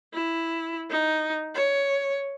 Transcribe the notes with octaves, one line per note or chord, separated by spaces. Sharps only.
E4
D#4
C#5